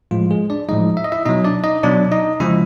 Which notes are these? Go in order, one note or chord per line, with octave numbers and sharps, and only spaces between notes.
A2 F3 G#3 F4
G#3 G#4
D4 D5
A2 F3 G#3 D#4 D#5
E5
D#5
E4 E5
B2 F#3 D#4 D#5
D4 D5
D#4 D#5
B2 F#3 D4 D5
D#4 D#5
C#3 F3 G#3 E4 E5